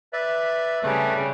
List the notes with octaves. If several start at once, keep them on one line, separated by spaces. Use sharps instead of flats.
B4 D5 E5
C#3 G3 A3 G#4 B4